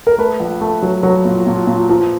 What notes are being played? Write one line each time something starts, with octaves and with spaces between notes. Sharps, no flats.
A#4
A3 B4
A#1
A3
F#3
F#3
A#2
A#2
A#2
F3